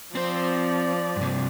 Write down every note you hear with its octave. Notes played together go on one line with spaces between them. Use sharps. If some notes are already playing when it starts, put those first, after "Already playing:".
F3 C4 C5 D5
G2 C3